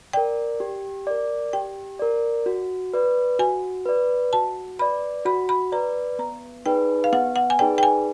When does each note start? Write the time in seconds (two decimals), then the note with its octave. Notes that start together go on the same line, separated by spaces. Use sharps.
0.13 A#4 D5 G5
0.60 G4
1.07 A#4 D5
1.53 G4 G5
1.99 A#4 D5
2.46 F#4
2.94 B4 D5
3.39 F#4 G#5
3.86 B4 D5
4.33 F#4 A5
4.79 B4 D5 B5
5.25 F#4 B5
5.49 B5
5.72 B4 D5 A#5
6.19 B3 A#5
6.66 D#4 G#4 B4 D5 G5
7.04 F5
7.13 B3 F#5
7.36 F#5
7.50 G#5
7.59 D#4 G#4 B4 D5 G5
7.78 G5
7.83 G#5